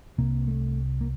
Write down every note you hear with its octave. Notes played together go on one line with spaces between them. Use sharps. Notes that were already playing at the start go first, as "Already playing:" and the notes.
C2 C3 A#3
A3
A#3